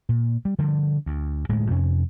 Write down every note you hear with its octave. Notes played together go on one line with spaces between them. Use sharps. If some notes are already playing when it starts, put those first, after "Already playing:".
A#2
G3
D3 F3 G3
D2
D1 A2 G#3
F2 C3 C#4